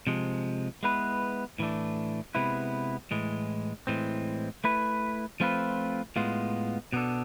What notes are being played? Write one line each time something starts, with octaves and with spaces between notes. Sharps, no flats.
C3 F3 G#3
G#3 B3 E4 B4
A2 E3 A3 D4
C3 G#3 B3 E4 B4
A2 E3 G#3
A2 E3 G#3 C4
A3 E4 B4
F3 A3 C4 F4 B4
A2 G#3 B3 F4
B2 B3 D4 A4